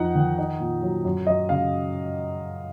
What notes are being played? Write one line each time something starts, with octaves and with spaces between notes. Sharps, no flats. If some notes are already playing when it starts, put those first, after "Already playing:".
Already playing: F2 D#4 F#5
D#3
D#4
A#2
F#3
F#2
F#2 D#5
C#3 F5